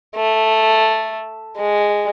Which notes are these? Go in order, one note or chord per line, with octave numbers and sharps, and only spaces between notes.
A3
G#3